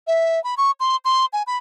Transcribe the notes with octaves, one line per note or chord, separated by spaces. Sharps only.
E5
B5
C#6
C6
C6
G#5
B5